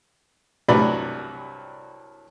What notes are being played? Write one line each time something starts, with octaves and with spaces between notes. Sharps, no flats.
C2 G2 F#3 B4 D5 B5